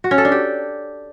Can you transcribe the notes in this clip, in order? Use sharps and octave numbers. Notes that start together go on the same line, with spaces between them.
F#4
C#4
A4
D4
G4